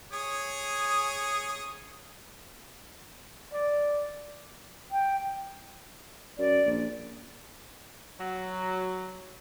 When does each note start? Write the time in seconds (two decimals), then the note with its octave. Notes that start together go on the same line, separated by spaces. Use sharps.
0.13 G#4 C#5 D#6
3.53 D5
4.92 G5
6.38 F#2 D5
6.66 A#1
8.20 F#3